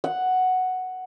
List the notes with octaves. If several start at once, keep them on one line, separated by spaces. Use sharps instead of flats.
F#5